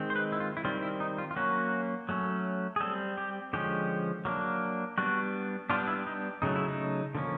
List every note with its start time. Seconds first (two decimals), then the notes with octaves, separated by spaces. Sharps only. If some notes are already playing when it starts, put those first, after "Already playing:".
Already playing: D#3 G#3 C4
0.10 C5
0.16 B4
0.32 E4
0.40 F4
0.57 E4
0.64 D#3 G3 C4 F4
0.82 E4
1.00 D#4
1.18 F4
1.31 F4
1.36 F#3 A#3 C#4 F#4
2.09 F#3 A3 C#4
2.76 G#4
2.80 G3 C4 A4
3.18 G4
3.53 D3 F3 G#3 C#4 G4
4.25 F#3 A#3 D4
4.98 G3 B3 D4 F#4
5.70 G3 B3 D4 F4
5.88 E4
6.07 D#4
6.42 C#3 F#3 A3 D#4
6.56 E4
6.68 D#4
7.15 D3 F3 A#3 C#4